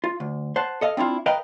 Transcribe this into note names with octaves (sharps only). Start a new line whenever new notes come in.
F4
D2
C5 F#5 A5
A4 D#5 F5
C4 D4 E4 F4
A#4 B4 D#5 F5 G5